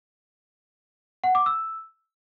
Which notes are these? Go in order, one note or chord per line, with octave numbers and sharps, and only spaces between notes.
F#5
D6
E6